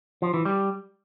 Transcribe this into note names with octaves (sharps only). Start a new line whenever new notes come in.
F3
E3
G3